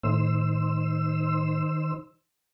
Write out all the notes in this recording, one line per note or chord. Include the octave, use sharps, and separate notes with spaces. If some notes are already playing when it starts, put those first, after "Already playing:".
A2 D#3 C5 E6